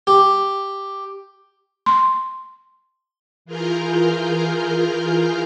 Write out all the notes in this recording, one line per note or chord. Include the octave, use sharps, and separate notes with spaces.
G4
C6
E3 F4 G#4 A#4 F6 G6